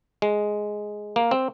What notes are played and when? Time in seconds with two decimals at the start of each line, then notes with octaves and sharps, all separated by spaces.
0.22 G#3
1.16 A#3
1.31 C4